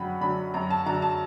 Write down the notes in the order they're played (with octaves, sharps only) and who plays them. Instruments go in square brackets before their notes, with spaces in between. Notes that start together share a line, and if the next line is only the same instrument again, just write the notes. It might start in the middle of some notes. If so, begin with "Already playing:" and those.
Already playing: [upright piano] F#2 D3 F#3 F#5 G5 B5
D3 F#3 B5
F#2 A#5
A5
D3 F#3 A#5
A5